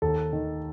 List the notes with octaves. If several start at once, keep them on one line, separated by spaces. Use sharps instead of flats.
D#2 A4
D#3